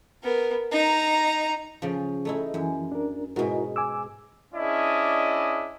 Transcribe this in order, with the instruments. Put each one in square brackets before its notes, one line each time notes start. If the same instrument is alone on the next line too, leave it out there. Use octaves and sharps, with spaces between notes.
[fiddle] B3 A#4
D#4 A#5
[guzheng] C#3 F3
A3 D#4 E4
[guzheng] F#2 [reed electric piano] E3
[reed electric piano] D4 A#4
[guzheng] G#2 B2 [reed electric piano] E4 F#4 A#4
[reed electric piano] G#5 D6 E6
[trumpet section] C#4 D4 E4 G#4 D5 D#5